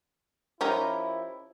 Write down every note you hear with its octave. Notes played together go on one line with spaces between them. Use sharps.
F3 C#4 D#4 E4 G4 A#4